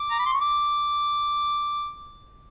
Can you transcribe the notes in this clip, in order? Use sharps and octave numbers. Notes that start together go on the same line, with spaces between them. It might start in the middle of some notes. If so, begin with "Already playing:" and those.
Already playing: D6
A#5
B5
C6
C#6
D6